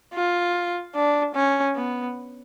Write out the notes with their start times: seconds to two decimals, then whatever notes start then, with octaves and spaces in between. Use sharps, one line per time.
0.13 F4
0.94 D4
1.35 C#4
1.76 B3